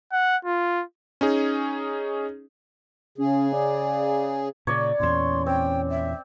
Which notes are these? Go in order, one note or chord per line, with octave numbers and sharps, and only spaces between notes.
F#5
F4
C#4 D#4 G#4
C#3 C#4 G#4
D5
A#2 C#3 C#5 D5
E2 A#2 C#4 C6
C4 G5
E5